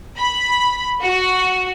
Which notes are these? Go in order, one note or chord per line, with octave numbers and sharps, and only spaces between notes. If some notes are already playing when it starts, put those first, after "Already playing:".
B5
F#4